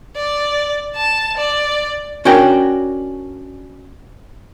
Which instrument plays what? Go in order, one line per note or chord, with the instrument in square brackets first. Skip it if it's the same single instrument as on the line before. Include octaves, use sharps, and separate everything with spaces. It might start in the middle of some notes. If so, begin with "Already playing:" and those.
[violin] D5
A5
D5
[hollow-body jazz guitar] C#4 D4 F#4 A#4 G5